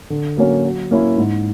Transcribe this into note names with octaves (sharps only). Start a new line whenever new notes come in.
D3
F#3 A#3 C#4
F#3
A#3 C#4 E4
G#2